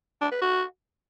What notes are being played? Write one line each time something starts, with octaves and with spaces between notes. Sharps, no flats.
D4
B4
F#4